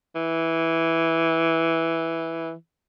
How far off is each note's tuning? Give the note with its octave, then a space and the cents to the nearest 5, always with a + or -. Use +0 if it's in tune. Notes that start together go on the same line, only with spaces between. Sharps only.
E3 -5